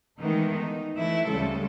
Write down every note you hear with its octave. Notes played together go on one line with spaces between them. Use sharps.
D#3 E3 G#3 A3 B3 D#4
D#4
E3 A3 E4
D2 C#3 G3 G#3 A4